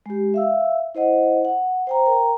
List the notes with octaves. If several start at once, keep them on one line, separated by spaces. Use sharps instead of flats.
G#3 G4
E5 F5 E6
E4 C5 D#5 F#5
F#5
C5 G5 A#5
A#4 G5 A#5